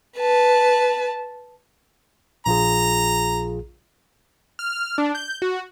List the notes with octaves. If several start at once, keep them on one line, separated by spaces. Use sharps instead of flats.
B4 A5
A#1 F4 G#4 A#5
F6
D4
G6
F#4